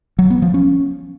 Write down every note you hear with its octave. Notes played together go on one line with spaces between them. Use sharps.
F#3
B3
F3
C#4